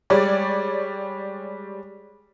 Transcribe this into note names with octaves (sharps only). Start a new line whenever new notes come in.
G3 G#3 C#5 D5